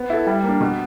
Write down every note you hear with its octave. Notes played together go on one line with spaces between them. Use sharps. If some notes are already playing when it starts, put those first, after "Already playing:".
Already playing: B3
E4 A4
G3
A#3 D4
B2